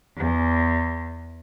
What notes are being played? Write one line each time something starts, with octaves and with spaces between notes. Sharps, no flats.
E2